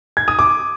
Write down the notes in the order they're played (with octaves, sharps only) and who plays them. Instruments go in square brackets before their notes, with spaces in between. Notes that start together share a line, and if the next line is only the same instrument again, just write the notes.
[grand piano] G#6
D#6
D6